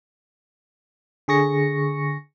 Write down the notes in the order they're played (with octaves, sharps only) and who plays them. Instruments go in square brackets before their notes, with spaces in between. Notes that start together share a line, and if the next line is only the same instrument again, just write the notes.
[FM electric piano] D3 G#4 C#6 A#6 C#7